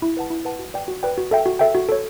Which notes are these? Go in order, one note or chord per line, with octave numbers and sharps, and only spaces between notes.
E4
B4 F#5 A5
E4
B4 F#5 A5
F#4
B4 D5 G5
F#4
B4 D5 G5
F#4
A4 E5 G5
F#4
A4 E5 G5
F#4
A4 C#5